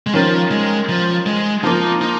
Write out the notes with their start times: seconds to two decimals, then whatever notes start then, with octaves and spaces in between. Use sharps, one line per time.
0.07 G#3
0.14 D#3 F3 C#4 A#4
0.51 G#3
0.89 F3
1.26 G#3
1.64 F3 A#3 D#4 F4
2.01 D#4